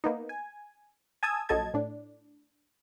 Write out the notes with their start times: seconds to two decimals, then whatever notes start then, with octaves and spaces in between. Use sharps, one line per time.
0.04 A#3 B3 D#4
0.29 G#5
1.23 G#5 A5 D#6 E6 G#6
1.49 A#1 F#3 A4 D#5 A5 G#6
1.74 A2 D4